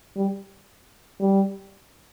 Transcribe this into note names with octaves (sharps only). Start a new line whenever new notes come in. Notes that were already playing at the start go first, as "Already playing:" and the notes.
G3
G3